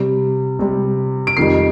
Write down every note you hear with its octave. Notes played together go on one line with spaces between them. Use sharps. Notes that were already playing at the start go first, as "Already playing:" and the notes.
Already playing: C3 G3
C3 G3
D7
F2 D#3 G3 C7